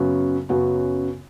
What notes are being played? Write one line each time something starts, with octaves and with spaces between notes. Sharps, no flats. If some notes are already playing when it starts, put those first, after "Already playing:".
Already playing: F#2 C#3 F#3 B3 F#4
F#2 C#3 F#3 B3 F#4